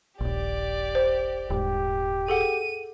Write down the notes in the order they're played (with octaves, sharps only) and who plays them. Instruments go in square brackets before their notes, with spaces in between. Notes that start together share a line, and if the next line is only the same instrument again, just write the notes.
[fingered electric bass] D#1 A#1 [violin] G4 D5
[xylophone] C5
[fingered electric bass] D#1 G#2 [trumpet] G4
[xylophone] G#4 A4 F#5 [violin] D#7